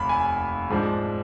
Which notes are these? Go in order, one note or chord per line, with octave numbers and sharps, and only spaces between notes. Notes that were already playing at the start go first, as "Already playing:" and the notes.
Already playing: F1 D#2 B5
G#5
G#2 F3 G#3 D4